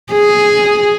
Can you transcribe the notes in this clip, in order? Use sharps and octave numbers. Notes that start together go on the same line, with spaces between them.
G#4